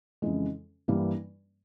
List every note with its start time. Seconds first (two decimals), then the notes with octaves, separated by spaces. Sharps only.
0.22 F2 C#3 E3 G#3
0.88 G2 E3 G3 A#3